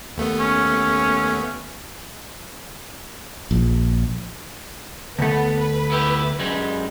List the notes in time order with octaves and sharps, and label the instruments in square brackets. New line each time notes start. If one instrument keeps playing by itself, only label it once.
[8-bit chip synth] D#2 A3 B3
[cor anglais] C#4
[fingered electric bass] A#1
[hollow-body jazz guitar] D2 A3 [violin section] B3
[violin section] B4
[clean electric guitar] B3 E4 G4
F#2 G3 G#3